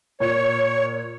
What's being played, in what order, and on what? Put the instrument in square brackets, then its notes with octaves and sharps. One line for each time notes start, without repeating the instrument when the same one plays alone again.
[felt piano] A#2 [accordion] C#5